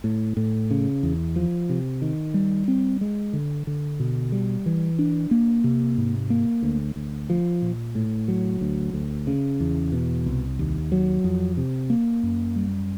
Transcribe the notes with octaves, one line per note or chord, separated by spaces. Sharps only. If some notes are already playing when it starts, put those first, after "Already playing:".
A2
A2
C#3
E2
F3
C3
D#3
G3
C4
G#3
D3
D3
B2
G3
E3
D4
A#3
C3
G#2
A#3
D2
D2
F3
A#2
A2
F#3
D2
D2
C#3
E2
B2
C2
D#2
F#3
F2
C3
A#3
F#2
G3